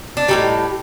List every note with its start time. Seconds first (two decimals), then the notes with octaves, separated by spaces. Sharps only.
0.17 D4
0.28 A2 E3 G3 D#4